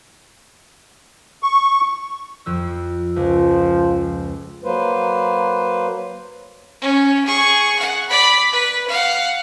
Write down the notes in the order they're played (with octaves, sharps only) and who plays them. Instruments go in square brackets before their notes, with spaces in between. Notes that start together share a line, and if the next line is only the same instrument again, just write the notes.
[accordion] C#6
[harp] F2 F3 E6
[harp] C#2 [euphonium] F3
[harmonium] F#3 A#3 B4 C5
[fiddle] C#4
G#4 C#6
F#5
D5 B5
B4
F5 F#5